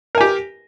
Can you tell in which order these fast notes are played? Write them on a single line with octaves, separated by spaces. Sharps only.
A#4 G#5 G4